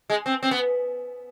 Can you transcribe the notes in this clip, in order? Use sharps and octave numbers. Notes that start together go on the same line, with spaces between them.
G#3
C4
C4
B3